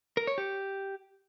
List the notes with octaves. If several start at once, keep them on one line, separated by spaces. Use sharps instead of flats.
A#4
C#5
G4